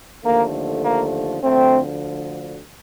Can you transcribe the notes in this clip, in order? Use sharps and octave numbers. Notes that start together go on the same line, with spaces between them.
D#2 D3 F3 A3 A#3
A#3
D2 D3 F3 A3 C4